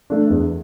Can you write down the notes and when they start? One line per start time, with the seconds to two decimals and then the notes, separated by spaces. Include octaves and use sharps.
0.10 A3 D4
0.30 E2